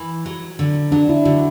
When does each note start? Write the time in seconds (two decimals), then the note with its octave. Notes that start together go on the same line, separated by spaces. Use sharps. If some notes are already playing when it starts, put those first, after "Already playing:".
Already playing: E3
0.26 F#3
0.59 D3
0.92 F#3 D4
1.09 E4
1.25 D3 F#4